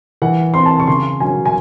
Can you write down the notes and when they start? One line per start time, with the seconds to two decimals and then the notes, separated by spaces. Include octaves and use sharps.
0.22 E3 F#5
0.54 C4 C6
0.66 A5
0.80 C#6
0.87 C#3 C6
1.20 F#3 C#4 G#5
1.46 G#5